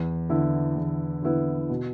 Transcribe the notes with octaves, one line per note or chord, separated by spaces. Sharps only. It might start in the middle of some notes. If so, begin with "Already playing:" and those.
Already playing: E2
D3 B3 E4
E2
D3 B3 E4
B2